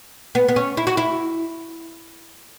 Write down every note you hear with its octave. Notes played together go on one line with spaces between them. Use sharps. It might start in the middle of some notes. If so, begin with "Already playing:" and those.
B3
B3
C#4
E4
F#4
E4